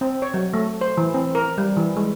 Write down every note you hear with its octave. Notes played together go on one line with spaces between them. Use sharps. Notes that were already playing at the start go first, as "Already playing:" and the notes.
C4
C#5
F#3
A3
C5
E3
C4
A#4
G3
E3
G#3